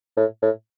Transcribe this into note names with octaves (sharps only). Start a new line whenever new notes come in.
A2
A2